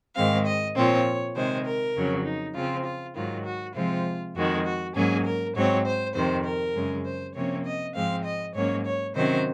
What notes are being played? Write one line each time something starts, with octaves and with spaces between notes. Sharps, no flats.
G#2 D#3 G#3 C4 F5
D#5
A#2 F3 C4 C#5
C3 D#3 G#3 C5
A#4
F2 C#3 F#3 C#4
D#4
C#3 F3 C4 F4
F4
G#2 D#3 F#3 F4
F#4
C3 F3 G#3 C4 F4
F2 D#3 G#3 F#4
F#4
G#2 F#3 A#3 C#4 G#4
A#4
G#2 F#3 C4 C#5
C5
F2 C3 D#3 C5
A#4
F#2 C#3 G#3 C#4
C5
C3 F3 A#3 C#4 C#5
D#5
G#2 F3 G#3 C4 F5
D#5
G#2 F#3 A#3 C#4 C#5
C#5
C3 D#3 F#3 C#4 C5